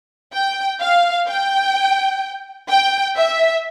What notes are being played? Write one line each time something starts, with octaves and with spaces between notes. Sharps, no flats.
G5
F5
G5
G5
E5